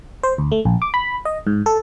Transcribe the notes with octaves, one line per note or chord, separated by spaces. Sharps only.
C5
D2
A3
A#1
D6
B5
D#5
G#2
A4